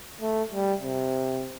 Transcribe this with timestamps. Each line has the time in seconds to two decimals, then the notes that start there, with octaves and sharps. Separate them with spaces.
0.22 A3
0.52 G3
0.82 C3